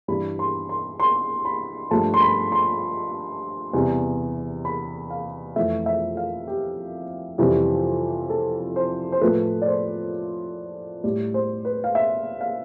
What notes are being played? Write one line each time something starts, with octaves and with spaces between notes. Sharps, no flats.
G2 E3 G3 B5
C6
C6
C6
B5
G2 F3 A3 A5
C6
B5
C6
E2 C3 G3
B5
F5
F2 E3 A3 E5
E5
F5
G4
F2 C3 E3 G3
A4
C5
C5
A2 F3 A3 B4
D5
C5
A2 G3 D5
C5
B4
F5
E5
F5